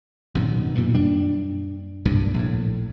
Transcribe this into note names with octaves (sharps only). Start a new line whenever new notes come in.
F#2 A#2 D#3 F#3 C4
B2
G2 A#2
F#2 G3 D4
C2 G2 A#2
A#1 A2